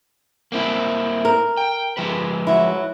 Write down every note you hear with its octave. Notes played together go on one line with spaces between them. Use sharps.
A#3 C4 E4
A#4
G5
F3 G#3 B4
F#3 E4